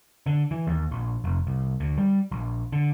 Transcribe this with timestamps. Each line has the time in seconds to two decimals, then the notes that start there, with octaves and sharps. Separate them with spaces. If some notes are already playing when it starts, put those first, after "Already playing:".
0.26 D3
0.51 E3
0.67 D#2
0.91 A#1
1.24 F1
1.47 C2
1.80 D2
1.98 G3
2.32 A#1
2.73 D3